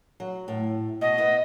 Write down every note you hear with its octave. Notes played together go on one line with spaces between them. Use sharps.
F#3
A2
B2 D#5
B3 E4